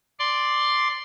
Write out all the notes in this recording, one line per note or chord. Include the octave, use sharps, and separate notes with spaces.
D5 C6